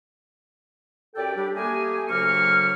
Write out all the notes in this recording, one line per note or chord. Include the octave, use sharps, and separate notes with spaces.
F#2 G4 A4 D5 G5
G3 D4 G4
A3 A#3 G4 G#4 A#4 G#5
D2 C#3 F#3 A#3 C#6 F6